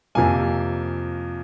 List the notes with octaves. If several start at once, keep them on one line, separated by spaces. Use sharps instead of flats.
F2 C3 F3 A#3 G#5